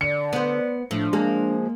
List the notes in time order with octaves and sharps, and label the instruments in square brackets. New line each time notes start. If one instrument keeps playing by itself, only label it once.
[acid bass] D3 [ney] D5 [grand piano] C#7
[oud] B3 C5
[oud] A2 [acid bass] F3 [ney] D4
[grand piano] G#3 [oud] A#3